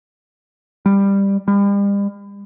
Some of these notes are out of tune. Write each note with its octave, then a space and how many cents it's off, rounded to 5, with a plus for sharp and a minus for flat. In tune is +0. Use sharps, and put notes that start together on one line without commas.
G3 +15
G3 +40